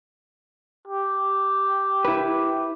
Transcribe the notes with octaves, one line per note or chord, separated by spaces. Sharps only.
G4
E4 B4